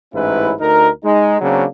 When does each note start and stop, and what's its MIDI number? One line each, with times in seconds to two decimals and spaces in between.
0.13 0.52 33
0.13 0.52 44
0.13 0.52 61
0.13 0.52 64
0.13 0.52 71
0.60 0.89 38
0.60 0.89 63
0.60 0.89 70
1.04 1.37 56
1.04 1.37 63
1.41 1.66 49
1.41 1.66 54
1.41 1.66 58
1.41 1.66 60
1.41 1.66 62